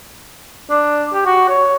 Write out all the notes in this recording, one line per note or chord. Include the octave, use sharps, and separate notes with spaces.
D4
G4
F#4
C#5